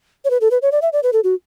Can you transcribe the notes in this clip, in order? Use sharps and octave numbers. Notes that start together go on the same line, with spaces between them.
C#5
B4
A4
B4
C#5
D5
E5
D5
B4
A4
F#4